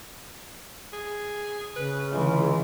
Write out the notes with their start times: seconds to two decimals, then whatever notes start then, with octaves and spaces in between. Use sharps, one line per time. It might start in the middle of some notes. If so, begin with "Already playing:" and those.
0.93 G#4
1.76 C#3 B4
2.12 C#2 D3 E3 A3